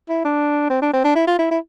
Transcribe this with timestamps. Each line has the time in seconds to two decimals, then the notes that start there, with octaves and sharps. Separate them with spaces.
0.09 E4
0.24 D4
0.70 C4
0.82 D4
0.93 C4
1.04 D4
1.16 E4
1.27 F4
1.39 E4
1.51 E4